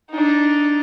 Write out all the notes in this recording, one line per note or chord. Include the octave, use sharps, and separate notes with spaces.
D4 D#4